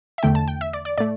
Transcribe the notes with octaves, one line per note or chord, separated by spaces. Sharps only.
E5
E2 D3 A3 G5
A5
G5
E5
D5
D5
A2 A3 D5